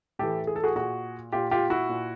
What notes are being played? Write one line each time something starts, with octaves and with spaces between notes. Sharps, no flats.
A2 E3 G4 A4
G#4
A4
F#4 G#4
A#2 F#4 G#4
A#2 F4 G4
F4 G4
E4 F#4
A#2